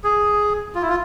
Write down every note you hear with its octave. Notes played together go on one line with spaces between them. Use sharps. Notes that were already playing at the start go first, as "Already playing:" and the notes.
G#4
F4
E4
F4